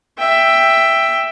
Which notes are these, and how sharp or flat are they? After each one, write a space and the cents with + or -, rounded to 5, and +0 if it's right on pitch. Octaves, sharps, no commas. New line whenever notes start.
E5 +5 G5 +10